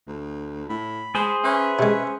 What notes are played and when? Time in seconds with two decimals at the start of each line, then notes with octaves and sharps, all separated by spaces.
0.08 D2
0.69 A2 B5
1.15 G#3 G#4 C5
1.44 C#4 B4 E5
1.79 C3 G#3 C#4